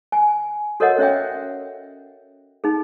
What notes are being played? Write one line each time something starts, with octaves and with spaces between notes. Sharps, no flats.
G#5
F#4 A4 A#4 C#5 D#5 F#5
C#4 C#5 E5 G5
D#4 G#4